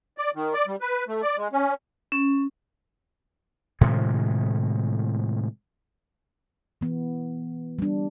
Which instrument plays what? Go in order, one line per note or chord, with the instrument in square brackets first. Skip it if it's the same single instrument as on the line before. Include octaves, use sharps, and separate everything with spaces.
[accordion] D5
D#3
D5
G3
B4
A3
D5
G#3
C#4
[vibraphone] C#4
[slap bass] A2 C3 D#3 G#3
[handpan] E3 B3
G3 D4